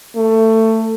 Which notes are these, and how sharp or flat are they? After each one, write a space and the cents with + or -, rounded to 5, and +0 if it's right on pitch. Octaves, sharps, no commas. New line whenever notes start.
A3 +20